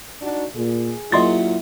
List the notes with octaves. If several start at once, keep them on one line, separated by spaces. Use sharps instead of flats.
D4 D#4 F#4
A#2 G#4
F#2 A#2 E4 D#5 C6 A6